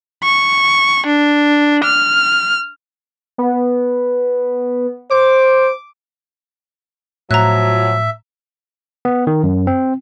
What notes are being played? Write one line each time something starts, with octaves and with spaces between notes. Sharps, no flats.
C#6
D4
F6
B3
C5 D6
A2 F3 F#3 E5 A#5 F#6
B3
D#3
F#2
C4